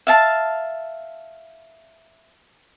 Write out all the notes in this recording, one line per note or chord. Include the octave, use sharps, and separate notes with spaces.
E5 F5 A5